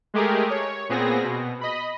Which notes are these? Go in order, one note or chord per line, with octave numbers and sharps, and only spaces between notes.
G#3 A3 G4 G#4 A#4
C#5
A#2 B3 C4 G#4 A#6
B2
D#5 B5